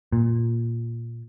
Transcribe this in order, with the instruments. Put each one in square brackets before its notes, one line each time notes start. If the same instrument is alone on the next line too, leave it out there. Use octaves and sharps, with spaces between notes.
[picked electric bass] A#2